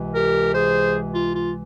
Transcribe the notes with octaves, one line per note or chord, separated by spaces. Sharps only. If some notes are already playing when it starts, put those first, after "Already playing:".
Already playing: C#2 C3 E3 G#3
G4 A#4
G#4 C5
F4
F4